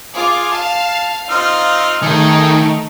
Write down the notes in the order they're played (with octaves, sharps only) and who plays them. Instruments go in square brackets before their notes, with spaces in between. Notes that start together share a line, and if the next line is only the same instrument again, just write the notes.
[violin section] F4 D6 [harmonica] G#4
[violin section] F5 [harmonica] A5
[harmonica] C4 D#4 F6 [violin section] F4
[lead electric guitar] D#3 [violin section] A3 D#4 [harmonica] G#4